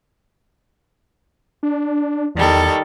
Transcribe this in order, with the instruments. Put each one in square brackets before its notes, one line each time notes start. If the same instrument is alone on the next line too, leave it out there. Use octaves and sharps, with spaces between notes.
[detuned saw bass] D4
[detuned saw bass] E2 [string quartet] D#3 G3 A4